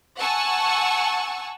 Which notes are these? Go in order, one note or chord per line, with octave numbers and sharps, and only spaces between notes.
F#5 G#5 A5 C#6 E6